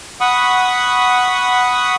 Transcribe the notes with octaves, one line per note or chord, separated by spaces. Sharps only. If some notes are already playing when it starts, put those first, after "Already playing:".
F#5 B5 C#6 D#6